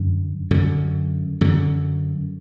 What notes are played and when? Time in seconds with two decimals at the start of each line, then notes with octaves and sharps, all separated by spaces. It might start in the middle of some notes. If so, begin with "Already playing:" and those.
Already playing: F#2 D3
0.51 F#2 D3
1.41 F#2 D3